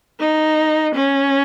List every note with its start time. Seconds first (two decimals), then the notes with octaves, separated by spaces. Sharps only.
0.20 D#4
0.95 C#4